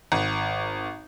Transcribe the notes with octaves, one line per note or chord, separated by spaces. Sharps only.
G#1